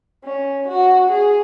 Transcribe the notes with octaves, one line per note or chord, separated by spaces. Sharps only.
C#4
F#4
G#4